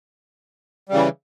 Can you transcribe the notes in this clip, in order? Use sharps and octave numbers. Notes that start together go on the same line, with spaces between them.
C#3 E3 G3